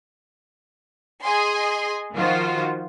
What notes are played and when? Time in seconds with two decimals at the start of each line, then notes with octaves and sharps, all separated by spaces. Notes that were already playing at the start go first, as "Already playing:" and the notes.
1.23 G#4 D#5 G#5 C6
2.15 D#3 F3 F4 F#4 C5